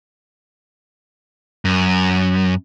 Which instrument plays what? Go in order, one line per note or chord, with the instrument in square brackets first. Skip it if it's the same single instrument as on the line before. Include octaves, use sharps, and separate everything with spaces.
[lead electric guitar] F#2